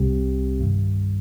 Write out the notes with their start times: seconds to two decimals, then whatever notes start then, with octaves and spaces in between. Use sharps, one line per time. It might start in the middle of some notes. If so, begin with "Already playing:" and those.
Already playing: C2 C3 G3 C4 G4
0.60 G2 D#3 G3